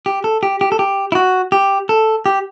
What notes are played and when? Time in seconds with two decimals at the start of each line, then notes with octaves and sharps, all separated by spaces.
0.06 G4
0.24 A4
0.43 G4
0.61 G4
0.72 A4
0.79 G4
1.12 E4
1.15 F#4
1.52 G4
1.89 A4
2.26 G4